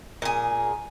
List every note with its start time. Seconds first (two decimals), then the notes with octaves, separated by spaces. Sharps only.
0.22 A#2 G#4